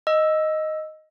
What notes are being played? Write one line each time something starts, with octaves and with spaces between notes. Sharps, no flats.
D#5 E6